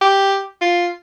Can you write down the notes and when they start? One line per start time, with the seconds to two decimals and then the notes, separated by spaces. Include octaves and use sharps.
0.01 G4
0.61 F4